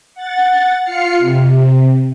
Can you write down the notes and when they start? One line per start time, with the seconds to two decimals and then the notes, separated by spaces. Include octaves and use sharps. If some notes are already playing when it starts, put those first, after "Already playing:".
0.14 F#5 A6
0.82 F4 F6 C7 C#7
1.18 C3